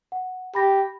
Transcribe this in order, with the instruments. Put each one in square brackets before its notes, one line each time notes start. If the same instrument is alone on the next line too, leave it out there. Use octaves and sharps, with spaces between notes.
[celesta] F#5
[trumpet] G4 [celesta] B5 A#6